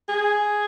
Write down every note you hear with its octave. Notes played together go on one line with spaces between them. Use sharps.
G#4